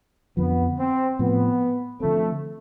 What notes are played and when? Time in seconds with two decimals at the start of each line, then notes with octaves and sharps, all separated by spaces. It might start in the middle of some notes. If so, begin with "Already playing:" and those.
0.37 F2 D3 F3 B3
0.79 C4
1.19 A2 F3 B3 C4
2.00 D3 F3 A3 C4